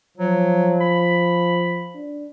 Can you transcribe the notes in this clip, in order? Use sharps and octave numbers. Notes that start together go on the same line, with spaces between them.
F3 F#3
B5
D4